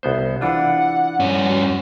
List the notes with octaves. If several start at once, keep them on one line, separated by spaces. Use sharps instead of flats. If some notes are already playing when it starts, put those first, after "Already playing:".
C2 B3 C5
E3 D4 F4 F#5
G2 C#4
F#4